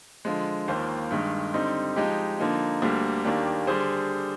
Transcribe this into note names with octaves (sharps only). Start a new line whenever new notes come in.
D3 F3 G#3
D#2 D#3 A#3 F4 C5
G2 D#3 G#3
D3 G3 C4 D#4
F3 G#3 D#4 G4
D3 F3 A#3 D#4
D2 D3 G3 A#3
D#2 D#3 A#3 D4 G4
D3 G3 D4 G#4 C5